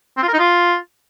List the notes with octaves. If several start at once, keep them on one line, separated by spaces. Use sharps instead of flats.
C4
F4
A#4
D#4
F4